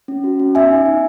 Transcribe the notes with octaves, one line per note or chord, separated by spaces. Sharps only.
C#4
F#4
C#4
B3 E5 G#5
D#4
D#4